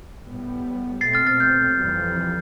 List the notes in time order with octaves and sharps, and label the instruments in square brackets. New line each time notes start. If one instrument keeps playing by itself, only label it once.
[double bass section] A2 G3 B3
[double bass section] B2 A3 C4 [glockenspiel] A6 C7
[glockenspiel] F6 A6
F6 A6
G6
[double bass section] F2 C3 E3 G3